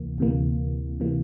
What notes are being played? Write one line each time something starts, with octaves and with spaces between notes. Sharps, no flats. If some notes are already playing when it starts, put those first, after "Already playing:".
Already playing: D2 C3 E3 A#3
D2 C3 E3 A#3
C3 E3 A#3